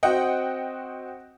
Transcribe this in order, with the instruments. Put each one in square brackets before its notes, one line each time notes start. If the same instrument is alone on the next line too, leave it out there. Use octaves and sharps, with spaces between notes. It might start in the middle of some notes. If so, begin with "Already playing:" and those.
[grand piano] C4 F#4 [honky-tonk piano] D#5 F#5 G5